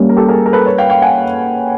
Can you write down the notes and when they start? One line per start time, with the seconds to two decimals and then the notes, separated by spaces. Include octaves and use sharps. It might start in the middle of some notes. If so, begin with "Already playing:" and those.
Already playing: G3 A#3 C#4
0.09 A#4
0.17 G4 A4
0.28 G#4 A#4
0.46 A#4
0.53 A4 B4
0.66 B4 C#5
0.78 F5 G5
0.90 F5 G5
1.02 F#5 G#5